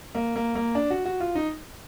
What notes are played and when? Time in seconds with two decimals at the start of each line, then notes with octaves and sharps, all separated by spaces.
0.15 A#3
0.36 A#3
0.55 A#3
0.75 D4
0.90 F#4
1.05 F#4
1.20 F4
1.35 D#4